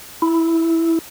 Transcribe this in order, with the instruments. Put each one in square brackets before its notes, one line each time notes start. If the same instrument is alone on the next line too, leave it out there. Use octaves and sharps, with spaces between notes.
[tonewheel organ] E4